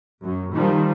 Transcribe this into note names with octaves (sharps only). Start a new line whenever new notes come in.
F#2
D#3 F3 G3